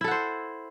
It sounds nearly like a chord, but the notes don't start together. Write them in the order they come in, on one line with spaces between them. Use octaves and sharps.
E4 A4 F#5 C5